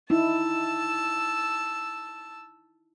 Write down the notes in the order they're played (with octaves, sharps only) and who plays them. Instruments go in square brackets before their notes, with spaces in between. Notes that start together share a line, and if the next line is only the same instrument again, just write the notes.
[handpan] D#4 E4 [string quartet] A5 E6